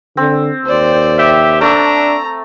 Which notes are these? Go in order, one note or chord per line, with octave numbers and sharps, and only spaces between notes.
D3 C4
D#2 C5 D5
G4 E5
A3 D4 A#5 E6